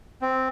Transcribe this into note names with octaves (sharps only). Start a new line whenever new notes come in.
C4